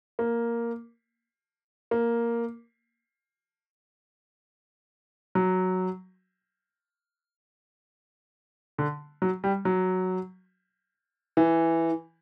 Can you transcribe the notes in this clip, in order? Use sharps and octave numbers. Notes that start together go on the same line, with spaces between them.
A#3
A#3
F#3
D3
F#3
G3
F#3
E3